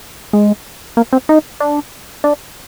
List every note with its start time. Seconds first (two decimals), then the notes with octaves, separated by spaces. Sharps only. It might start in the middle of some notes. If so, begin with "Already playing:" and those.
0.33 G#3
0.97 A#3
1.13 C4
1.29 D#4
1.60 D4
2.24 D4